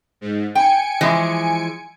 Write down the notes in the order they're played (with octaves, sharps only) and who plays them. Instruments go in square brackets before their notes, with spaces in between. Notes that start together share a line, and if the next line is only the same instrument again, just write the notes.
[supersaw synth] G#2
[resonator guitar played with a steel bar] G5 [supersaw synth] G#5 C#7 D7
[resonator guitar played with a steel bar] E3 F3 G#3